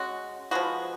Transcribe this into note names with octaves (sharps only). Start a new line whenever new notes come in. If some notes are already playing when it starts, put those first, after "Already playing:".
Already playing: G#3 C#4 F#4
F3 G#3 B3 F#4